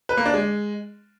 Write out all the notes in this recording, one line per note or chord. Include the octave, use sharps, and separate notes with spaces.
B4
A#3
D4
G#3